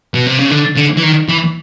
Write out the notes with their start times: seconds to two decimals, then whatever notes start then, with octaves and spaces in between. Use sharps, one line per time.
0.14 B2
0.26 C3
0.38 C#3
0.51 D3
0.76 D3
0.97 E3
1.03 D#3
1.29 E3